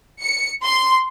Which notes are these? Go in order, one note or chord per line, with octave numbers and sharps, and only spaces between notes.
C#7
C6